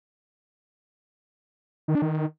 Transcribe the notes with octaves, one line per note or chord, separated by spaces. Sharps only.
D#3
D4
D#3